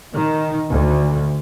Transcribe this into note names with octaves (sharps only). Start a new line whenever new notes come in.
D#3
D2